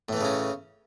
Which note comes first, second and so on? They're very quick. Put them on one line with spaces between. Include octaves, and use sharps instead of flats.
A2 E3 A3 C#3 C#4